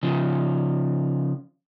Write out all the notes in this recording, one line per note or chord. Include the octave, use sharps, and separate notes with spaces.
C#3 F3